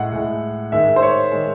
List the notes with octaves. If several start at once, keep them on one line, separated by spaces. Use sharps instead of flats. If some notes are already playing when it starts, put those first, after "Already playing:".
Already playing: A2 G#3 F#5
A2 G#3
G#2 D#3 G#3 E5
C5
C#5
D#3 G#3